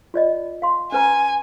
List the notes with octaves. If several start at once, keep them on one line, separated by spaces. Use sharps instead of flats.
F4 D5 D#5
F5 C6
C#4 B4 G#5 A#5